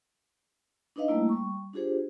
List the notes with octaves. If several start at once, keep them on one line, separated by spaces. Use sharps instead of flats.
D4 D#4 B4 D#5 F5
G3 A3 A#3 E4
G3 C#6
D4 F4 G4 G#4 C5